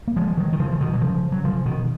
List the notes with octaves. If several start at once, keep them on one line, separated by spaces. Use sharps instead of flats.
A#3
F3 G#3
D#3 F#3
D#3
C#3 F3
F3
B2 D#3
F#3
C#3 F3
F#3
C#3 F3
B2 D#3